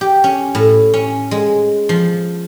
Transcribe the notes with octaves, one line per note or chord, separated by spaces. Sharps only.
G4
C#4
A2
C#4
G#3
F3